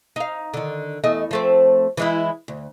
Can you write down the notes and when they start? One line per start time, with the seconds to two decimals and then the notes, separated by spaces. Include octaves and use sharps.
0.16 D#4 F5
0.54 D3 D#3
1.04 E2 A3 D#5
1.31 F3 A3 C4
1.97 E3 G#3 E4
2.48 D2